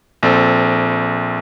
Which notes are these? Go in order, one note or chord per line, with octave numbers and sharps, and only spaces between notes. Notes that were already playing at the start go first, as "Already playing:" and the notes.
A#1 C4 A4